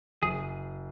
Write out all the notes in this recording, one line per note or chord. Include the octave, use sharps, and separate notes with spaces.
F#1 G#4